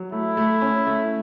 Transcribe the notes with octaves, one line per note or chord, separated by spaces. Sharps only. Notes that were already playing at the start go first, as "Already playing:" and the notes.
Already playing: F#3
A3 E4
A3
C#4
A3